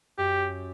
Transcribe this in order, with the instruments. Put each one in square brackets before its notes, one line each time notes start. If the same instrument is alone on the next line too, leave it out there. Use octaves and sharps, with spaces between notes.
[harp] F#2 [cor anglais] G4